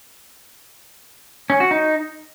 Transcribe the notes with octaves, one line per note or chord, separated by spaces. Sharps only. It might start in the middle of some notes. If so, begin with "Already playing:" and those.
C#4
F#4
D#4